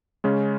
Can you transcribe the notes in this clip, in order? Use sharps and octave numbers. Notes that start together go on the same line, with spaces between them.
C#3 G#3 C#4